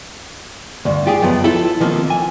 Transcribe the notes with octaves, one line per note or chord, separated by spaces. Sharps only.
D2 G2
F4 G4 G#4
C#2 F#2 F3 B3
E4 F4 A4
D#3 F3 A#3 C4
G#5